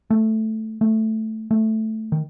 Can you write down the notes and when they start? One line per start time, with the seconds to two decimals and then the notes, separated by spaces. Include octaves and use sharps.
0.10 A3
0.81 A3
1.51 A3
2.12 D#3